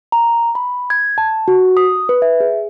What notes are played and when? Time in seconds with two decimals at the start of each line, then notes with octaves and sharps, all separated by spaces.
0.12 A#5
0.55 B5
0.90 G#6
1.18 A5
1.48 F#4
1.77 D#6
2.09 B4
2.22 E5
2.40 G#4